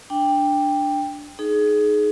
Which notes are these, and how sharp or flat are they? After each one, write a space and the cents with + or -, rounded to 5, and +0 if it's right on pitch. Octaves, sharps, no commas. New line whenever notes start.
D4 +0 G5 +10
D#4 -5 G#4 +25